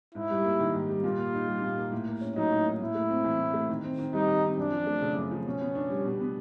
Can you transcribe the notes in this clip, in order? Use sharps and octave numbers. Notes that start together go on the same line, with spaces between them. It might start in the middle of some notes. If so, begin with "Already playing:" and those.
G#2 E4
G3
A#3
D#3
G#2
G3
A#2 F4
A#3
D#4
G3
A#2
A#3
A2
A#3
C#4
F#3 D#4
A2
A#3
A2 E4
A3
C4
E3
A2
A3
D#3
C4
D#3
G3 D#4
D#3
C4
F#2 D4
F3
A3
C#3
F#2
F3
B2 C#4
B3
D4
G3
B2
B3